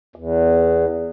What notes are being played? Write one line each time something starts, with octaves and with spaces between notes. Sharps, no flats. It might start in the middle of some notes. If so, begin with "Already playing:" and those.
E2